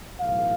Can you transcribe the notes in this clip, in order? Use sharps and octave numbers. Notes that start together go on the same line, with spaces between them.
B1 A2 E3 A3 F5